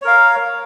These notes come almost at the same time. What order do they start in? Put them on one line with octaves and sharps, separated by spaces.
C#5 A#4 F5